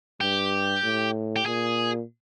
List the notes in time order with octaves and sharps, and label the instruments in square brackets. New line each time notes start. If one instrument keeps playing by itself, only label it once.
[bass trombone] G2 [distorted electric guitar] G4
[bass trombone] A2
[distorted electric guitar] G4
[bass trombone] A#2 [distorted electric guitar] G#4